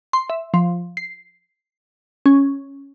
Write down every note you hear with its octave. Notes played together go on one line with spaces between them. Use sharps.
C6
E5
F3
C7
C#4